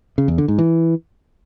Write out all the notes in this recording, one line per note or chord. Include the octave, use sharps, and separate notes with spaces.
C#3
E2
D3
G#2
E3